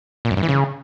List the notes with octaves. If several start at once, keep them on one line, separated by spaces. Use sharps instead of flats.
A#2
F#2
G2
E3
C#3